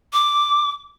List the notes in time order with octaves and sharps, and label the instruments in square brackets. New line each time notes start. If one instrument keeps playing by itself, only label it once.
[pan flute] D6